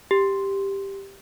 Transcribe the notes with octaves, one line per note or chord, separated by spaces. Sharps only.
G4